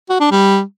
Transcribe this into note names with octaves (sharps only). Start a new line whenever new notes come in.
F#4
D4
G3